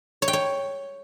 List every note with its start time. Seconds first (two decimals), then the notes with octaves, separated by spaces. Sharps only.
0.22 C#5
0.28 G5
0.33 C#5